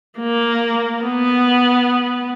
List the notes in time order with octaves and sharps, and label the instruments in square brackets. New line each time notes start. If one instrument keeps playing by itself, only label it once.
[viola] A#3
B3